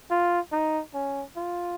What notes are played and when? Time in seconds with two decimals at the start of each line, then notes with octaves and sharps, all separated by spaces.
0.10 F4
0.52 D#4
0.94 C#4
1.36 F4